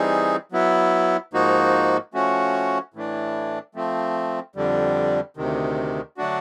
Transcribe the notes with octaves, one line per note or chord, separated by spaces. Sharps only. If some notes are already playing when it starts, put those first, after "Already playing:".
Already playing: E3 G3 C4 D#4 G#4
F#3 B3 E4
G#2 F3 A#3 D#4 F#4
F3 A3 C#4 F#4
A2 E3 A3 D4
F3 A3 C4
F2 D3 G3
D2 C3 D#3
D3 F#3 A3 D4 F#4